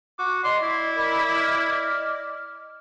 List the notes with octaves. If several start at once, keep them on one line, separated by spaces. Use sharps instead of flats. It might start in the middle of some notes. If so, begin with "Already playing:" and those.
F#4 D6
D5 D#5 C6
E4
A#4 D#5 B5
D#5 F6